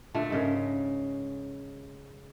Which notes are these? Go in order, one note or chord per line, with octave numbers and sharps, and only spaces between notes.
A#2 D3 A3
G#2 C#3 A#4